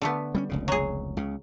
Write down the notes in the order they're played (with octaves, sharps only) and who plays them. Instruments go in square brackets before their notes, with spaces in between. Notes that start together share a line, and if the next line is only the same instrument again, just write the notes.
[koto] D3 A3 B3
[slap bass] G3 C4 C#4
F1 C#2 C#3
[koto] F#3 G#4
[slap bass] C#2 C#3